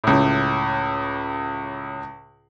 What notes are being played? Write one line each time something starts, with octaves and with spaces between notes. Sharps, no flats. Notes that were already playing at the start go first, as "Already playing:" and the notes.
C#2 A2